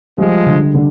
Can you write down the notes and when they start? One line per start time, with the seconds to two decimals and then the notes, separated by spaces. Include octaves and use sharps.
0.18 F3 G3 G#3
0.46 D3
0.74 D3